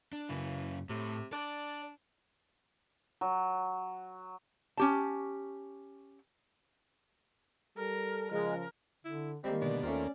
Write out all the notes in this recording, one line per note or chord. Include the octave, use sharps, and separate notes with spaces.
D4
F#2 C#3 E3
A2 C3
D4 D5
F#3
C#4 G4 A5
G3 A4 A#4
C#3 F3 G#3 A#4
D3 E4
D#3 G3 G#3 A#3 C4
B2 D3 D5
D#2 A3 A#3 C4 C#4 F4